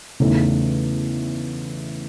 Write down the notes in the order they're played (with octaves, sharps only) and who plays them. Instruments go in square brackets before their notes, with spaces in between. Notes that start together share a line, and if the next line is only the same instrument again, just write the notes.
[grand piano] E2 C#3 E3 A3 D#4